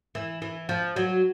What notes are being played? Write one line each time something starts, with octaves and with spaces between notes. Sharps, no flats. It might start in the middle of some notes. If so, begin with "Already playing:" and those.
E3
E3
F3
F#3